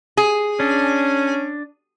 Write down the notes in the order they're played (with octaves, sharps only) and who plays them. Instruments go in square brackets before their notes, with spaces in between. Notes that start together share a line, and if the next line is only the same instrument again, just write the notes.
[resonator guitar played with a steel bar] G#4
[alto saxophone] C#4 [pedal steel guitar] D4